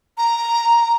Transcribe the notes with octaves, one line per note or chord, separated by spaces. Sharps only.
A#5